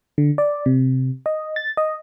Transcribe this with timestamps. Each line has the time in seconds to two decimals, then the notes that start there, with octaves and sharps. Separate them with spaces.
0.18 D3
0.38 D5
0.66 C3
1.26 D#5
1.56 A6
1.77 D#5